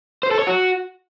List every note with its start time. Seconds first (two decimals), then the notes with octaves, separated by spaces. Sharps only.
0.23 C5
0.31 A4
0.39 C#5
0.47 F#4